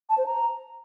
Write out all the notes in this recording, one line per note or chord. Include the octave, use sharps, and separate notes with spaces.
A5
C5
A#5